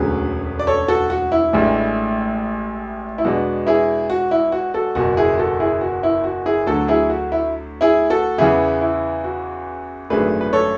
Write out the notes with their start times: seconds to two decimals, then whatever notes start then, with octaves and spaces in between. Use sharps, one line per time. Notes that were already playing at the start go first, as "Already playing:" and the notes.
Already playing: E1 D2 D3 F#3 C#4 G#4 B4
0.59 D5
0.67 A4 C#5
0.88 F#4 A4
1.10 F#4
1.32 E4
1.53 A1 A2 E3 G#3 D4
3.18 E4
3.24 E2 B2 G#3 B3 D4 F#4
3.67 E4 G#4
4.10 F#4
4.31 E4
4.52 F#4
4.74 F#4 A4
4.95 F#1 E2 B2 F#4
5.17 E4 G#4
5.38 F#4 A4
5.60 E4 G#4
5.81 F#4
6.03 E4
6.24 F#4
6.46 E4 G#4
6.67 D2 D3 F#3 F#4 A4
6.88 E4 G#4
7.10 F#4
7.32 E4
7.81 E4 G#4
8.10 F#4 A4
8.38 E2 C#3 E3 B3 E4 G#4
8.81 E4
9.24 F#4
10.10 G#1 F#2 D3 A3 D4 G#4 B4
10.41 B4
10.53 A4 C#5